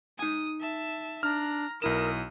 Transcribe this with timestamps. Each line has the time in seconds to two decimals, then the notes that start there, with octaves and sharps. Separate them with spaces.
0.19 D#4 G#5 D#6
0.61 E5 A5
1.23 D4 A#5 F6
1.82 B1 E4 A#4 D#6 E7